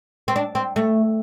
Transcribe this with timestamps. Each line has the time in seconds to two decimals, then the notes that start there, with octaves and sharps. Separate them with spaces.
0.28 C4
0.36 D4
0.55 C4
0.76 A3